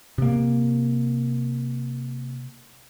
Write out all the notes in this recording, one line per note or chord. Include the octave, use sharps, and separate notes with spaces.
C3 A#3